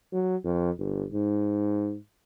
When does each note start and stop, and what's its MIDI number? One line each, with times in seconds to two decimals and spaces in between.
0.13 0.36 54
0.45 0.71 41
0.79 1.06 31
1.13 1.97 44